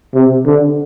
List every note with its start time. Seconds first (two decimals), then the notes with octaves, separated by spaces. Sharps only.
0.15 C3
0.46 D3